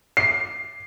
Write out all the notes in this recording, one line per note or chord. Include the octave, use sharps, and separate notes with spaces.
C7